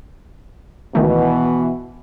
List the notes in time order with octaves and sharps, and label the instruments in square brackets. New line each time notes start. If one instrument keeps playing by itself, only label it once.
[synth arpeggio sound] C#2 D#3 A3 [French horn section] B2 E3